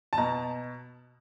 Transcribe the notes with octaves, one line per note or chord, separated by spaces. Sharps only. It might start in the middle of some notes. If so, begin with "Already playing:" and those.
A5
B2 A#5